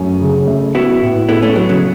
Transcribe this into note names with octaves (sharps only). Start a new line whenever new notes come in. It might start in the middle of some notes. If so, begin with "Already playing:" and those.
Already playing: F#2 A3 C#4
C#3
A3
B3 E4 F#4
A2
B3 E4 A4
A3 C#4
F#3 B3 A4
C#3 F#3